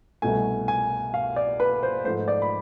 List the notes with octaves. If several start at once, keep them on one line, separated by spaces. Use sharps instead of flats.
C2 B2 A3 G#5
G#5
F5
D5
B4
C5
G#2 F3 A3 C5
D5
B5